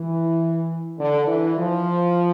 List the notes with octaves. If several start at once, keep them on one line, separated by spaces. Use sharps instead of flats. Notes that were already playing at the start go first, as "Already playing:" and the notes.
Already playing: E3
D3
E3
F3